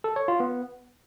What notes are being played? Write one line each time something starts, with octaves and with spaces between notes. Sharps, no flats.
A4
C#5
F4
B3